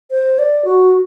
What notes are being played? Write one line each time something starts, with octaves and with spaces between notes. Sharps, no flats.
C5
D5
F#4